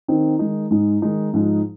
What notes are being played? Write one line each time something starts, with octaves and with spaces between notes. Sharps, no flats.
D#3 C4 D#4
D#3 G#3 D#4
G#2 G#3 D#4
D#3 G#3 D#4
G#2 F3 G#3 D#4